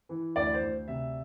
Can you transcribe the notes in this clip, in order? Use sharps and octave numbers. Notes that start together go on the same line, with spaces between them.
E3
D2 D5
C5
D2
C3 E5